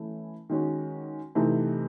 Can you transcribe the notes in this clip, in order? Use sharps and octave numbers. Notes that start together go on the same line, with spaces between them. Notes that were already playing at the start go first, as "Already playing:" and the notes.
Already playing: E3 A3 C#4 E4
D#3 G#3 C#4 F#4
C3 E3 A3 D#4